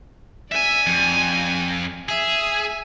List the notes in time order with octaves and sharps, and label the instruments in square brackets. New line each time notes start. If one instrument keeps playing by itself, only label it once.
[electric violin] D5 G#5 [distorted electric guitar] E5
[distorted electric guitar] F2
[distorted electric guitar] G#4 [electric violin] E5 G#5